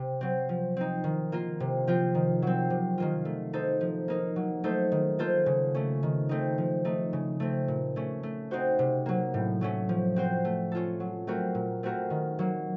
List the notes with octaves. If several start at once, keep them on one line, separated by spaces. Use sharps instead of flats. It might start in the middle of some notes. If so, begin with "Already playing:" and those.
Already playing: C3
F#3 C4
F3
C4 D#4
D#3
A#3 F4 A#4
C3
F3 C4 F4
D#3
F#3 C4
C3
D#3 A#3 F4
A3
D#4 A4 C5
F3
A#3 D#4 A#4
F#3
A3 D#4 A4 C5
D#3
A#3 F4 A4 C5
C#3
A3 C#4
D#3
A3 C4 D#4
F3
A3 D#4
C#3
A3 C4
A#2
A3 C#4
A3
C4 D#4 F#4 C5
C3
F#3 A#3
A2
F#3 A3 C#4
F3
C4 F#4 C5
A3
C#4 F4 A4
F#3
A3 C4 F#4 A#4
A#2
A3 C4 F#4 A#4
D#3
F#3 A#3